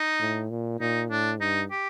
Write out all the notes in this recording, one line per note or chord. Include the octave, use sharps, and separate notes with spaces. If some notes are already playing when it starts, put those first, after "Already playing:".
Already playing: D#4
A2
A#2
A#2 D#4
A2 D4
G2 D#4
G4